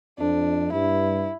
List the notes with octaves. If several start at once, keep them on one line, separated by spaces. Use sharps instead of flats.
F2 D4
G2 E4